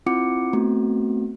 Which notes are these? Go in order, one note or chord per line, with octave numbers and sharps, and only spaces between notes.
C4 E4 F4 F#5 D6 C#7
A3 B3 C4 F#4